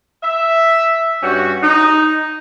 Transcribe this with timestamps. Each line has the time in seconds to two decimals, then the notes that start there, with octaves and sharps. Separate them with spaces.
0.23 E5
1.23 G2 G3 C#4 F#4
1.63 D#4